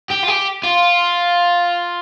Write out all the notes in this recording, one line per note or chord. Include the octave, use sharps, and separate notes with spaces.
G4
F4
G4
F4